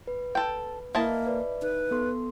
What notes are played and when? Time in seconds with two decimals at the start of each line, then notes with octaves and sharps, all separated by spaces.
0.07 B4
0.35 A4 G5
0.95 A#3 E4 D#5 A5
1.27 B4 D5
1.62 D#4 B4
1.91 B3 A4 C6